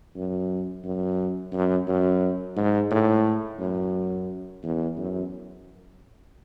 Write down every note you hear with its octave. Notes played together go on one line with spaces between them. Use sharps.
F#2
F#2
F#2
F#2
G#2
A2
F#2
E2
F#2